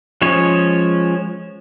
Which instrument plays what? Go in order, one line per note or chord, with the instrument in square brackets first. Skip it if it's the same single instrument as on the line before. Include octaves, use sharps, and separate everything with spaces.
[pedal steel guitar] F3 G#3 C#4 C#5